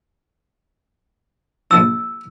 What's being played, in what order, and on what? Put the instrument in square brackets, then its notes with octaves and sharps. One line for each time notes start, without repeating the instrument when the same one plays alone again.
[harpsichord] A#1 F3 D4 [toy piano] E6